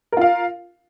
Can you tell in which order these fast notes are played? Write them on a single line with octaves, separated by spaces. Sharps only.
A#4 F4 F5